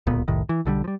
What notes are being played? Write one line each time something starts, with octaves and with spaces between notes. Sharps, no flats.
D1 C#2 A#2 B3
F1 C2 A2 D#3
E3
B1 D3 F3 G3
F3 G3